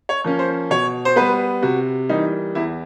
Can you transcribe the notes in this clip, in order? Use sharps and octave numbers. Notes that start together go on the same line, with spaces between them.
C#5
F3 A#3 C#4
C5
B2 C#5
C5
G3 B3 B4
C3 F#4
E3 G3 A#3 D#4
E2 E4